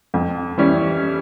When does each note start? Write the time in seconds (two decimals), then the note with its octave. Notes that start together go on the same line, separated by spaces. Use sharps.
0.14 F2
0.58 E3 G3 C#4